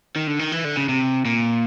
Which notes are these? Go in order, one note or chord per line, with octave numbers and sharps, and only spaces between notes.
D#3
D3
D#3
E3
D3
C#3
C3
A#2